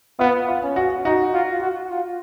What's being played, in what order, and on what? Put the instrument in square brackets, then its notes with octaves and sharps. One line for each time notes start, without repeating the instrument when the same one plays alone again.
[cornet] B3 [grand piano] F4
[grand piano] F4
[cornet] C#4
[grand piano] F#4
[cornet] D#4 [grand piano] F#4
[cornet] F4
F#4
F4